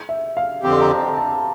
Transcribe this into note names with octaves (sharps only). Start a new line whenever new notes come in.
E5
F5
F2 D3 F3 C4 G4 D6
C6
A#5
A5
A5